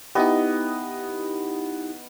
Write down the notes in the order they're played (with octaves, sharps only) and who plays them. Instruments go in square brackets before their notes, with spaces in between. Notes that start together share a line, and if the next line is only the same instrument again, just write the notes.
[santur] B3 D#5 [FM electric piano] D#4 E4 G4